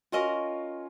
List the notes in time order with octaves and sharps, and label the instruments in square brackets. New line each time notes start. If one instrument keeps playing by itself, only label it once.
[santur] C#4 F4 [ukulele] F#4 A#4 D#5